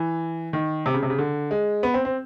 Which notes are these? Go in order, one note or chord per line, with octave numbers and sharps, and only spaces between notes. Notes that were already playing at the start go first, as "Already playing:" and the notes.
Already playing: E3
D#3
C3
C#3
C3
C#3
D3
G#3
B3
C4
C4